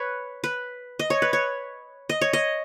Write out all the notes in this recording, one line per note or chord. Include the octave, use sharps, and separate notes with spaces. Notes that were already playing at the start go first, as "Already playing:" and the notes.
Already playing: B4 C#5
B4
D#5
C#5
B4
C#5
D#5
C#5
D#5